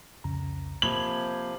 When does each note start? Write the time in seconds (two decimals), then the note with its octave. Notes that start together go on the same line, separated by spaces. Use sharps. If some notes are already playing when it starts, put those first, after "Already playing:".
0.24 C2 F2 C#3 A#5
0.82 C3 F3 A#3 B5 G#6 F#7